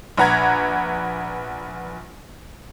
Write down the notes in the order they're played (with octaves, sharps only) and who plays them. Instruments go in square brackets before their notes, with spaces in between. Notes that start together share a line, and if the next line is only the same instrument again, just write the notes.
[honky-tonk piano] A#1 B4 F#5 A#5 G#6